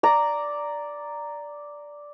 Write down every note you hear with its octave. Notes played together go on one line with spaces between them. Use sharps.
D5 A#5